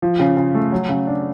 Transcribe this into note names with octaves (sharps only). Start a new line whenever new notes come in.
F3
C#3
C#3
A3
F#3
C#3
D4